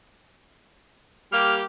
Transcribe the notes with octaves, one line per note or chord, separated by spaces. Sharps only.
G3 A#3 G4 F6